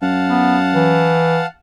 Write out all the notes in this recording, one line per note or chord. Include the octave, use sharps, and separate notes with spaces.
F#2 F5 F#5 A5
B3
E3